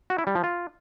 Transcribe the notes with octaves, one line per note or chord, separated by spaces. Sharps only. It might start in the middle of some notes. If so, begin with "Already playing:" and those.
F#4
E4
G3
F3
F4